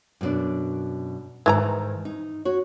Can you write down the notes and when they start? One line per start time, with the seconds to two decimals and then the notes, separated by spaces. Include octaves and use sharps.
0.21 F#2 B2 D4
1.46 G#2 D#3 E3 G#4 A#5
2.05 D#4
2.45 F#4 C#5